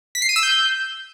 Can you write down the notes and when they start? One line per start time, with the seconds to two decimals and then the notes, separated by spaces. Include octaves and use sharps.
0.15 B6
0.22 C7
0.29 D#7
0.36 E6
0.43 G6